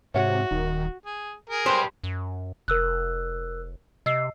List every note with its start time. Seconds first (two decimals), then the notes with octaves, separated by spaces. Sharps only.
0.14 G#2 C3 F#4 C#5 E5 F#5
0.51 D#1 D#3
1.05 G#4
1.50 G#4 A#4
1.66 G4 B4 C5
2.04 F#2
2.68 F1 A#4 E6 F#6
4.06 C3 D#5 E6 C7